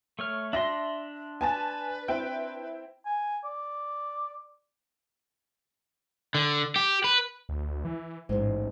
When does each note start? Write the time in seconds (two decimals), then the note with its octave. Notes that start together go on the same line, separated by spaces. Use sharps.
0.19 A3 C#5 F6
0.53 D4 E5 C6 A#6
1.41 B4 G#5 A5 A6
2.08 C4 E4 G5
3.06 G#5
3.44 D5
6.35 D3
6.76 G4
7.04 B4
7.49 D2
7.85 E3
8.29 A1 G#2 G#3